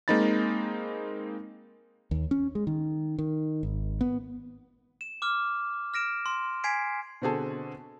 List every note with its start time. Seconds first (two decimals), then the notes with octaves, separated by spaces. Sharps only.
0.08 G#3 A#3 C4 D#4 B5 A6
2.11 D#2
2.31 C#4
2.55 G#3
2.67 D#3
3.19 D#3
3.63 G#1
4.01 B3
5.01 E7
5.22 D6 F6
5.94 F6 A#6 D7 E7
6.26 C6
6.64 G#5 G#6 B6 C7 D7
7.22 B2 D3 C4 F#4 G#4 A4